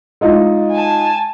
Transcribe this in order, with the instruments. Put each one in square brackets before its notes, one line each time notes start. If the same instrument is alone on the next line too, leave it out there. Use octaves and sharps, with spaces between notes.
[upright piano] G#3 D#4 F4
[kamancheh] G#5 A5